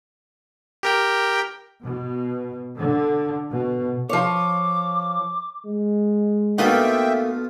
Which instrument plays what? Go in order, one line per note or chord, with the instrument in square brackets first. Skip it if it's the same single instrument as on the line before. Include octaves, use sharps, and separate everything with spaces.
[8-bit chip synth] G4 A#4 G5
[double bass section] B2
D3
B2
[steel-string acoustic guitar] F3 C#5 [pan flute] D6
[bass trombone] G#3
[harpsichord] B2 F4 D#5 [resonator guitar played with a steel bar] A3 A#3 D#4 [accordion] E5 G5